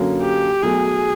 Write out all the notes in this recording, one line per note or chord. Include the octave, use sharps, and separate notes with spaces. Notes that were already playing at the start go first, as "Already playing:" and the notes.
Already playing: F#2 D3 F#3 A#3 C#4
G4
B1 B2 F#3 A3 G#4